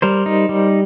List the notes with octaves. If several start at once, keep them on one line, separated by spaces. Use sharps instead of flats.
G3 A#4 C5
D#4
G3